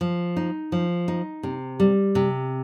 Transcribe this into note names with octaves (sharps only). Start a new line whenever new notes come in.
F3
D#4
F3
D#4
C3
G3
C3